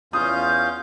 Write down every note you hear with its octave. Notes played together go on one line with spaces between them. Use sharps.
E2 C#4 F4 F5 D#6 G6